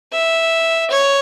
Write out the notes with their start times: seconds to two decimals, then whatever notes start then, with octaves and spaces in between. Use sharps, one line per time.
0.12 E5
0.91 C#5